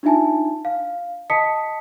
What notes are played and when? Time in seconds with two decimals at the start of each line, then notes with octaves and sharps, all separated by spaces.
0.03 D4 D#4 F4 E5 G#5 A5
0.65 F5
1.30 D#5 A5 D#6 B6 C#7